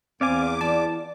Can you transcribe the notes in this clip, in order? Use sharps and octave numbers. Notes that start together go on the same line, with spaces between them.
E2 C4 D5 F5 G#5 D6
E3 F4 D5 A5